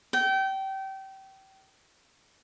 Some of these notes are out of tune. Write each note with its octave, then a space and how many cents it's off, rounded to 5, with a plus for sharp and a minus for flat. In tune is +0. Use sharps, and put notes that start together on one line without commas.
G5 -25